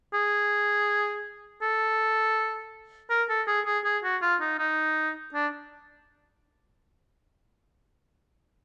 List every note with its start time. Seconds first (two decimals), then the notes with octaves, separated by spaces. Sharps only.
0.14 G#4
1.62 A4
3.10 A#4
3.29 A4
3.48 G#4
3.66 G#4
3.85 G#4
4.04 F#4
4.22 F4
4.41 D#4
4.59 D#4
5.34 D4